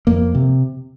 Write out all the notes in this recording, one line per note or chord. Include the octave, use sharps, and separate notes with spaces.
F2 A#3
C3